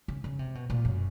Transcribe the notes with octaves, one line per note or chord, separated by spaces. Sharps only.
C#3
C#3
C3
B2
A#2
F#2